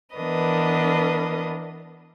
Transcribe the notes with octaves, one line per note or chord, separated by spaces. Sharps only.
E3 B3 D4 A#4 B4 D#5